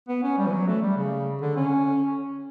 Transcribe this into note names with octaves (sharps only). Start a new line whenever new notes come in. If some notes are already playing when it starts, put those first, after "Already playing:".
B3
C#4
G3
E3
F#3
A3
G3
C#3
D3
C#4